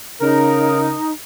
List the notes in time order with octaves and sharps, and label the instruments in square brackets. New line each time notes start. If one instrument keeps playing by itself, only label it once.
[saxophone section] C#3 A#4 [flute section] D#4